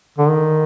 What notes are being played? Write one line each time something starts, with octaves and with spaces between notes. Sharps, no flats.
D3
D#3